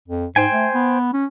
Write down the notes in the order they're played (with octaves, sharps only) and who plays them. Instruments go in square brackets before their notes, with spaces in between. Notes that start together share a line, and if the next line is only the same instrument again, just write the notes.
[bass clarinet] F2
[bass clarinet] G#2 [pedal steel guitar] C5 G5 G#5
[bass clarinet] A3
B3
C#4